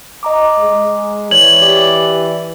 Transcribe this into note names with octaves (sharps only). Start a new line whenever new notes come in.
D#5 A#5 D6
G#3
E3 C#5 D5 G#6 F#7
G4 D5